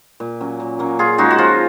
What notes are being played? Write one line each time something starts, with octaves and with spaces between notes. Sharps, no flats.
A#2
F#3 C#4
A#2
F#3 A#3 C#4
A#2 F4 G#4
G#3 C#4 D#4 F#4
F#4
F3 F4